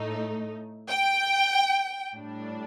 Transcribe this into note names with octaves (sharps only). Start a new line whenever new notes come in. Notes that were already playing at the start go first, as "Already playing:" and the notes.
Already playing: A2 A3 D#4
G5
A2 G3 D4